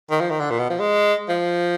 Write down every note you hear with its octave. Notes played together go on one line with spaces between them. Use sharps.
D#3
F3
D#3
D3
A#2
B2
F3
G#3
F3